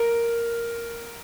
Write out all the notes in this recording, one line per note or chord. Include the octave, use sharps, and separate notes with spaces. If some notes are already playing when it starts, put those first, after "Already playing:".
Already playing: A#4